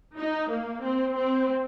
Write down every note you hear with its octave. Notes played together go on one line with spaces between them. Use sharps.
D#4
A#3
C4
C4